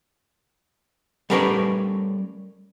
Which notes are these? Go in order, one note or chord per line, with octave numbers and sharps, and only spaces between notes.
G3 A3 C#4 A#4 B4 D5